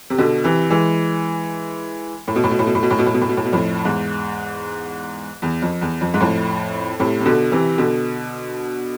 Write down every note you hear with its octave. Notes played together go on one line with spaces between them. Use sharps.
C3
B2 D3
C3 E3
E3 G#3
A2
B2
A2
B2
A2
B2
A2
B2
A2
B2
A2
B2
A2
B2
A2
B2
F2 A2
E2 G#2
E2
F2
E2
F2
G#2
F2 A2
A2 C3
C3
B2 D3
C3 E3
B2 D3